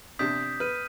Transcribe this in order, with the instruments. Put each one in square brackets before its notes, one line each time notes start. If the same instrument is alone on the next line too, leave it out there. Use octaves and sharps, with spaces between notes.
[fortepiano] C3 D4 [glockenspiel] D#6 G6 B6
[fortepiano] B4 [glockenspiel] F6 D#7